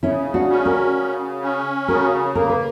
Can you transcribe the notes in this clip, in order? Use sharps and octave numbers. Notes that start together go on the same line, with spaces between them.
C#3 C#4 E4
D4 F#4
C#4
F#4 A#4
C#3
C#4
C#3 F#4 A#4
A#3 A#4
B4